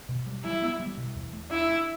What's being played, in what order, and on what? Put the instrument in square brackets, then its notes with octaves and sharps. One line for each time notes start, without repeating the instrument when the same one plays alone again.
[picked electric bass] B2
G3
[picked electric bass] G3 [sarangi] E4
[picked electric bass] B3
G3
B2
E2
A3
[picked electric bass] D4 [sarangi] E4
[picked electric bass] D4